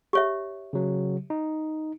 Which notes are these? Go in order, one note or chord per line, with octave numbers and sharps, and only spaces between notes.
G4 C#5 E5
C#3 F#3
D#4